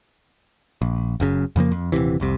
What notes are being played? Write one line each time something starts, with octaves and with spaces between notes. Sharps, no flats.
A#1
F#1 F#2 C#3
F2 C#3 F3 A#3
F2
D#1 G#1 C3 E3
F1 C2 C3